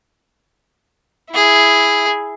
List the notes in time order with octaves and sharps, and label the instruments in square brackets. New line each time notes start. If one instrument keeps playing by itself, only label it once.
[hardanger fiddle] E4 G#4